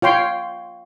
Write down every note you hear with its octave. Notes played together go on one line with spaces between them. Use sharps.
F4 C#5 G5 C6